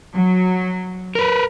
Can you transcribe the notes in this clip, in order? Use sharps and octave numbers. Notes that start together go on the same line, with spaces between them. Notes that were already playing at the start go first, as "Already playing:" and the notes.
F#3
A#4 B4